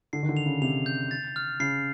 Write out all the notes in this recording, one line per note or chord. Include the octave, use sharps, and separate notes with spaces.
D3 C7
D#3
D3
F7
C#3
C3 F7
G6
A6
F6
C#3 C7